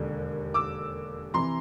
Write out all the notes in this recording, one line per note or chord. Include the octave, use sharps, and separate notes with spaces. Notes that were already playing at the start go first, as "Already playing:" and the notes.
Already playing: E1 D#2 D3
D6 E6
C3 E3 A#5 C6